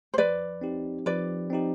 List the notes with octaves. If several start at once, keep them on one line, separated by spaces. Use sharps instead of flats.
C5
F3 B4 D5
C4 D#4 G4
F3 B4 D5
C4 D#4 G4